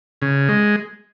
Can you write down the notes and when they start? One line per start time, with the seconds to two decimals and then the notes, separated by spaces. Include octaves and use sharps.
0.22 C#3
0.49 G#3